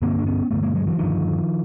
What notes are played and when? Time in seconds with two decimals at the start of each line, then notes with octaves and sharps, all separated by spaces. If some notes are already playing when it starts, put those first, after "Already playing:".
0.02 G2 D3 A#3 C4
0.19 D4
0.26 B3 C#4
0.51 G2 D3 A3 B3
0.62 G#3 A#3
0.75 F#3 G#3
0.87 E3 F#3
0.99 G2 D3 D#3 F3